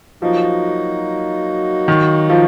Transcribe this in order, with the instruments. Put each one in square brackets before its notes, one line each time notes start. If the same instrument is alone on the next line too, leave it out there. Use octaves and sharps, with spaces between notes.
[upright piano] F3 [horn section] F#3 A#3 D#4 F#4
[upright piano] D#3
F3